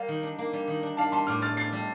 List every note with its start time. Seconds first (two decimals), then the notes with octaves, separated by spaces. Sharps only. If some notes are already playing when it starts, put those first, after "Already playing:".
Already playing: G3 A#3 F5
0.08 D#3
0.23 D4
0.38 A#3
0.53 G3
0.68 D#3
0.83 D4
0.97 D4 F5 A5
1.12 G3 A5 C6
1.27 A2 D6 F6
1.42 A4 F6 A6
1.57 D4 A6 C7
1.72 G3